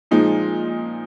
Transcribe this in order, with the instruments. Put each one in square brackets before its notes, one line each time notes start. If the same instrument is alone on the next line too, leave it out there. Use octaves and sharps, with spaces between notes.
[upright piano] A#2 F3 G#3 D#4